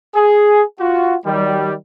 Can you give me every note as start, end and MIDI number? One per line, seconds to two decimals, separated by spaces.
0.15 0.62 68
0.80 1.15 65
0.80 1.15 66
1.26 1.74 51
1.26 1.74 54
1.26 1.74 55